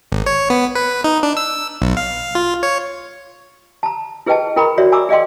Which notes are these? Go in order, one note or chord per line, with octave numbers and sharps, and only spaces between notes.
G#1
C#5
B3
B4
D#4
D4
E6
B1
F5
F4
C#5
A5 A#5
E4 G#4 B4 D#5 G5 A5
E4 A#4 G5 A#5 B5 C#6
F#4 C#5 D5 E5
G#5 A#5 C#6 D6 E6
G#4 D5 D#5 F5 G5 C6